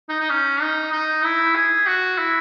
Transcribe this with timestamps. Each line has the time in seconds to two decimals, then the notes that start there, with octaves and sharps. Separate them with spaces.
0.09 D#4
0.20 D#4
0.30 C#4
0.61 D#4
0.92 D#4
1.24 E4
1.55 G#4
1.86 F#4
2.18 E4